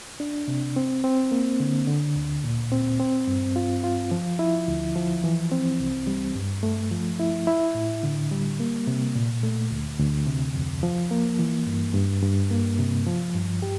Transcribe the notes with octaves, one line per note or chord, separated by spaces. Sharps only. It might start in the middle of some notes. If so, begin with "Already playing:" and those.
D4
C3
C4
C4
A#3
D3
D3
D2
A#2
C4
C4
G2
F4
F4
F3
E4
D2
F3
E3
C4
C2
G3
G2
A3
F3
E4
E4
A2
D3
G3
A#3
C3
A#2
A3
D2
D2
C3
F2
F3
A#3
E3
G2
G2
G2
A#3
C3
F3
G2
G4